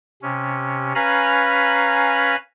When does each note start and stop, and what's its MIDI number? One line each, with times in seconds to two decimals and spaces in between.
0.22 0.93 48
0.22 0.93 61
0.95 2.36 61
0.95 2.36 71
0.95 2.36 77
0.95 2.36 80
0.95 2.36 82
0.95 2.36 83